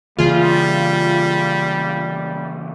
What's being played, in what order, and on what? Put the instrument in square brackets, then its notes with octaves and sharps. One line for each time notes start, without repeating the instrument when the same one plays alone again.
[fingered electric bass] C#3 E3 A#3 [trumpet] G3 [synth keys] F4 G#4